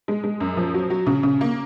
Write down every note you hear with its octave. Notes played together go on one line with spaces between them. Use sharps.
G#3
G#3
F#2
F3
F#3
F#3
C#3
C#3
A#3